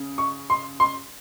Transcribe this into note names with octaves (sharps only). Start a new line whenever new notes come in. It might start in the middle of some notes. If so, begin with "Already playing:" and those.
Already playing: C#3
C#6
C6
C6